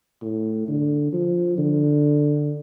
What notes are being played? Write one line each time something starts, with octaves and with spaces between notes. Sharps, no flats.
A2
D3
F3
D3